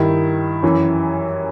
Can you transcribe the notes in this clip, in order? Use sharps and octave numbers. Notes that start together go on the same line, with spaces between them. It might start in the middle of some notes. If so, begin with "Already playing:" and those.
Already playing: G2 D#3 E4
F#2 E3